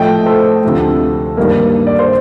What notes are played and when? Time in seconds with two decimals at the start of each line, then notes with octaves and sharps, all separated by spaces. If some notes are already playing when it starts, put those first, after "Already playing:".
Already playing: A2 F3 A3 D#5 G5
0.26 A4 C5
0.63 D2 C3 F3 A3
1.37 G2 D#3 G3 A#3
1.87 D5
1.99 C5